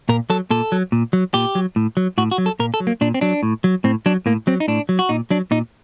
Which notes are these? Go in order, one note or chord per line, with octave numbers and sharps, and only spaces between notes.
A#2 A#4
F#3 A4
A#2 A4
F#3
A#2
F#3
A#2 G4
F#3
A2
F#3
A2 F#4
F#4
F#3
A4
A#2 A#4
A4
F#3
A#3
A#2 D4
C4
F#3 D4
A2
F#3
A2 C4
F#3 D4
A2 A#3
F#3 C4
D#4
A2 D4
F#3
F#4
A#2 D#4
F#3 D4
A#2 D#4